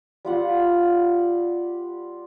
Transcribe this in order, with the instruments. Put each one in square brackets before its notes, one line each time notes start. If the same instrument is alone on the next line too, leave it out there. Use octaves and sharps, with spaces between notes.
[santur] G3 F4 F#5